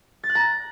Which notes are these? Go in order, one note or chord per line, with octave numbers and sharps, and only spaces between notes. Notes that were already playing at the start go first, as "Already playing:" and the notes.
A6
F#6
A#5